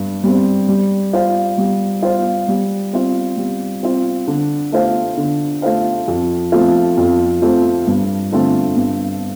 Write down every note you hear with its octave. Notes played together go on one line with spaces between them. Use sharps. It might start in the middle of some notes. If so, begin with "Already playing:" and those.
Already playing: G2 G3
G3 C4
G3
F4 C5 F5
G3
F4 C5 F5
G3
C4 F4
G3
C4 F4
D3
A3 F4 C5 F5
D3
A3 F4 C5 F5
F2
F3 A3 C4 F4
F2
F3 A3 C4 F4
G2
D3 A3 C4 F4
G2